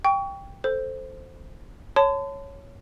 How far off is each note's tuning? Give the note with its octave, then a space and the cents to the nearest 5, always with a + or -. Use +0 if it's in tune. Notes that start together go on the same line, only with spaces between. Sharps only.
G5 +5 C#6 +30
A4 +0 C5 +0
C#5 +0 A5 +0 C6 -45